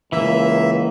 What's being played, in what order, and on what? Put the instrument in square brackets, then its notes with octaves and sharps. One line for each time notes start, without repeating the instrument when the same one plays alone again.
[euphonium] C#2 [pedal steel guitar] E3 A#3 E6 [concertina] E5